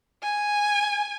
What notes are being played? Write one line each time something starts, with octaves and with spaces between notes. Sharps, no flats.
G#5